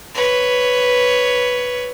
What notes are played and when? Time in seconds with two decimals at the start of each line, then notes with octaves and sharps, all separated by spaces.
0.14 B4 C#5